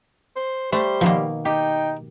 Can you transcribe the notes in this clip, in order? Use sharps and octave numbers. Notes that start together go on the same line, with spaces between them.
C5
G3 A3 C5
B2 D#3 F3 A#3
D#4 G4 G5